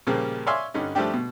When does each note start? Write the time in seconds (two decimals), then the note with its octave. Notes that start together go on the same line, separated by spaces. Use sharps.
0.07 A#2 C#3 F3 G3 A#3
0.47 C#5 D5 E5 F5 G#5 C6
0.74 G2 D3 C#4 D#4
0.95 F3 G3 A3 C4 D4 G4
1.14 B2